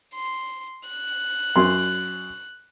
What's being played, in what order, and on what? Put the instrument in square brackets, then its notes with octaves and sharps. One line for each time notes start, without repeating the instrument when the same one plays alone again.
[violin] C6
F#6
[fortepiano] F#2 C6